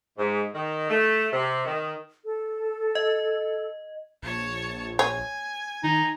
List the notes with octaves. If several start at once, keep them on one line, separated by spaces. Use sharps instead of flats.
G#2
D#3
A3
C3
D#3
A4
D#5
A#1 C#5 A5
C#5 G#5
D#3 D#4